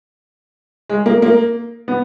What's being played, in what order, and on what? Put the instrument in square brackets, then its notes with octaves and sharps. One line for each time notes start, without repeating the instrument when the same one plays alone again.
[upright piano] G#3
A#3
A#3
B3